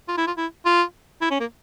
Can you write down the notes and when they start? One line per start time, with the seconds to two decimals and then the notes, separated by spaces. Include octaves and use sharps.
0.08 F4
0.17 E4
0.27 F4
0.37 E4
0.65 F4
1.21 E4
1.31 C#4
1.40 A#3